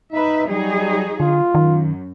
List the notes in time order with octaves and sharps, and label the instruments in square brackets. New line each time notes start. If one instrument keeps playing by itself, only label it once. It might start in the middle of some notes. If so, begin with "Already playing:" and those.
[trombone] D#4 [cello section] B4 E5
[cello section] F#3 D#4 G#4 [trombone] G3
[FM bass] D3 [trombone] F4
[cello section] F#2 [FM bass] D#3